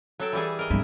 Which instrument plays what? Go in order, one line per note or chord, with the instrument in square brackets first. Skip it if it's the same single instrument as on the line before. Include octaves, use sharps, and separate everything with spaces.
[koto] F#3 A4 G5
E3 G3 G#4
A#4 D#5
[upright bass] G#1 G2 [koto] E4